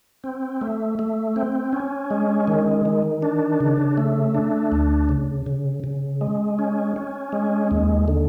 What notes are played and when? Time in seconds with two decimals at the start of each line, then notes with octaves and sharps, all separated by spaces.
0.24 C4
0.61 A3
0.99 A3
1.36 C4
1.73 C#4
2.11 G#3
2.47 D#3
2.85 D#3
3.22 D4
3.60 C#3
3.97 A3
4.35 D4
4.72 D2
5.09 C#3
5.46 C#3
5.84 C#3
6.21 G#3
6.59 C#4
6.96 C#4
7.33 G#3
7.71 D#2
8.08 D3